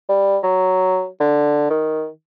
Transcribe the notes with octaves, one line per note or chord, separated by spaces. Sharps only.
G3
F#3
D3
D#3